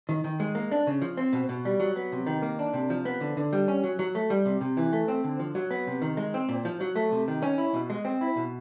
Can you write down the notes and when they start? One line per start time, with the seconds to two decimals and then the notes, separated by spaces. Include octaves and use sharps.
0.09 D#3
0.24 D#3
0.40 G#3
0.55 A#3
0.71 D4
0.87 C#3
1.02 F3
1.17 C4
1.33 B2
1.49 B2
1.65 G3
1.80 F#3
1.96 B3
2.12 C3
2.27 D#3
2.42 A#3
2.59 D4
2.73 C3
2.90 F3
3.05 B3
3.21 D3
3.37 D3
3.53 G3
3.68 C#4
3.84 F#3
3.99 F#3
4.15 A3
4.30 G3
4.45 C3
4.61 C3
4.77 E3
4.93 A3
5.08 C4
5.24 D3
5.39 F3
5.55 F#3
5.71 B3
5.87 C3
6.02 D#3
6.17 G#3
6.34 C4
6.49 A#2
6.65 F3
6.80 F#3
6.96 A3
7.12 C3
7.28 D#3
7.43 C#4
7.58 E4
7.74 B2
7.90 G#3
8.05 C4
8.21 E4
8.37 B2